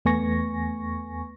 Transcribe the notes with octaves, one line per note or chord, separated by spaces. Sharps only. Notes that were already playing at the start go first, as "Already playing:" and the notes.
E2 A3 B3 G#5 C#6 A#6